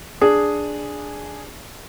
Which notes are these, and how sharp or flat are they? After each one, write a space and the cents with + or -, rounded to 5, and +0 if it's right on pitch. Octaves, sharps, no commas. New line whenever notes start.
D4 +0 G#4 +0